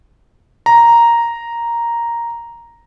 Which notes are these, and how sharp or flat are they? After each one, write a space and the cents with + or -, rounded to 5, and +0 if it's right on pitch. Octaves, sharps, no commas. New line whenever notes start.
A#5 +0